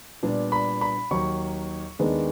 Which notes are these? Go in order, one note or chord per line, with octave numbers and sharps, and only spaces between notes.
A#2 G3 B3 D4
B5
B5
D#2 D#3 F#3 C#6
D#2 D#3 G#3 B3 D4